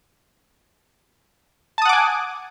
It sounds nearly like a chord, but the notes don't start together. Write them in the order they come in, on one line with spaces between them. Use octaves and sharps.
A5 D#6 F#5 D6 G#5